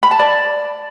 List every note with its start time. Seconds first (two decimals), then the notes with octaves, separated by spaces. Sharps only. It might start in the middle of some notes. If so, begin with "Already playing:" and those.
0.03 B5
0.11 A5
0.19 D5